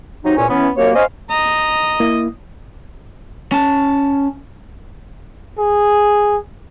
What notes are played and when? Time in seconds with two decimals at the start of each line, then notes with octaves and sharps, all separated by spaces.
0.24 C3 F#3 D#4
0.37 E2 A#2 C#4
0.50 E3 B3 C#4
0.77 C2 F#2 A#3 C#5
0.95 C#4 C5 D#5 F5
1.30 D#5 A#5
2.00 A#3 E4
3.52 C#4 A5
5.59 G#4